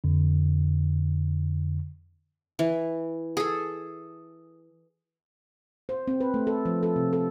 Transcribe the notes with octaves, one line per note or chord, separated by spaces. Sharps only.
F2 D3
E3
G#4 A4
C5
C4
B4
A3
A4
F3
A4
C3
A4